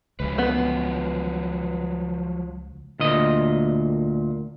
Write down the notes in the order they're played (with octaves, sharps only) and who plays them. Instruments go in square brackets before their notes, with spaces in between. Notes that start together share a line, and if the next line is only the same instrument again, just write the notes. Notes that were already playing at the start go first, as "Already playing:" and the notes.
[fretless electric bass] C#2 [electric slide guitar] F3 F#3 B4
[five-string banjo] B3
[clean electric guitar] D2 A#2 D#5